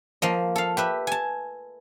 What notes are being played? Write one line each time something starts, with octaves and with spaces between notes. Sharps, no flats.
F3 A#3 D#5
A4 F5
G4 B4 E5
G#5 A5